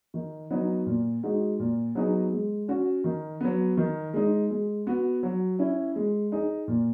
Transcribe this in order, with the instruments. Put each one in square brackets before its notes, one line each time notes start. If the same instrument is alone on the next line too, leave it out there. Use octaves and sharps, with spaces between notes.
[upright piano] D#3
F#3 B3 D#4
A#2
G#3 D#4 F#4
A#2
F#3 B3 D#4 G#4
G#3
C#4 F#4
D#3
F#3 B3
D#3
G#3 D#4
G#3
B3 F#4
F#3
C#4 E4
G#3
D#4 G#4
A#2